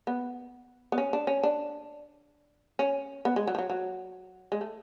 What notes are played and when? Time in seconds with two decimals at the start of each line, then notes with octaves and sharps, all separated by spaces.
0.07 B3
0.92 B3
0.98 C#4
1.13 D4
1.27 C#4
1.43 D4
2.79 C#4
3.25 B3
3.36 G#3
3.47 F#3
3.55 F3
3.58 F#3
3.70 F#3
4.52 G#3
4.61 A3